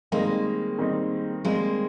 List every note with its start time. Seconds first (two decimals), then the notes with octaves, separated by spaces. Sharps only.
0.12 D#3 G3 G#3 A#3 C4 D#4
0.78 D#3 G3 C4 D#4
1.44 D#3 G3 G#3 A#3 C4 D#4